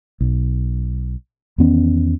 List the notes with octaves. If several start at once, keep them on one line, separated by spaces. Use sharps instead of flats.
B1
E2 D#3 B3 C#4